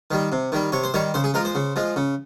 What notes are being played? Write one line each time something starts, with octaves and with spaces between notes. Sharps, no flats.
D#3 G3
C3
D#3 G3
C3 C#5
C5
D#3 G3 C#5
C#3 C5
G#4
F3 G#3 A#4
C5
C#3
F3 G#3
C#3